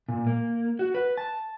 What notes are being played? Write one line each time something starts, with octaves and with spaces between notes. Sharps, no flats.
A#2
A#3
F#4
B4
A5